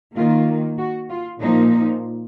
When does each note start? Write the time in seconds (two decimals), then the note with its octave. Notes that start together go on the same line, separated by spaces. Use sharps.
0.15 D#3 A#3 F4
0.77 F#4
1.09 F4
1.40 A#2 F3 A#3 D#4